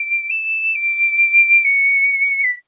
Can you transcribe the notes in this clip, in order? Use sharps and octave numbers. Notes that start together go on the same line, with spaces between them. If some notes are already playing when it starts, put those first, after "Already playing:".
Already playing: D7
E7
D7
C#7
B6